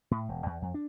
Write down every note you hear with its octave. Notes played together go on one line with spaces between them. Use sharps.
A2
E1
E2
F2
D4